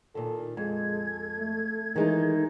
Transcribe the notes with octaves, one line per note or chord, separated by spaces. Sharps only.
A#2 D#3 A4
F2 G#3 A4 G#6
A3
D#3 E3 G#3 D#4